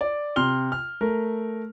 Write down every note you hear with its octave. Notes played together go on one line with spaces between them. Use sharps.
D5
C3 C6 F6 G7
F6
A3 A#4